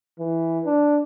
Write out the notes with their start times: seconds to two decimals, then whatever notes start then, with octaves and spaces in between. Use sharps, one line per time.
0.19 E3
0.66 D4